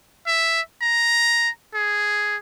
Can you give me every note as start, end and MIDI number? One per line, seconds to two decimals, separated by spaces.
0.27 0.61 76
0.82 1.49 82
1.74 2.36 68